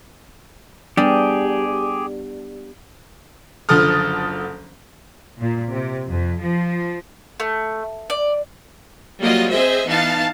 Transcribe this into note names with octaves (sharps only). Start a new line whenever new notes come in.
G3 B3 D4 G4 G#4
F#1 D3 F3 A4 D#6 F6
A#2
C3
F2
F3
A3
D5
F#3 G3 A#3 F4 D#5
C4 G#4 C5 D#5 E5
E3 B3 D#4 F5 A5